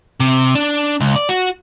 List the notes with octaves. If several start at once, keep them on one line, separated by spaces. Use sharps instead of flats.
C3
D4
C#2
D5
F#4